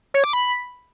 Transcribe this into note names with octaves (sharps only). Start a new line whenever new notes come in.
C#5
D6
B5